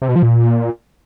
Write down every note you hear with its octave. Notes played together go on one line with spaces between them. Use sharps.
C3
B2
F3
A#2